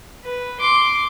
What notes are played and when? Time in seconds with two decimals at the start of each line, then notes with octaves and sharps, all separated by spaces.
0.24 B4
0.60 C6 D6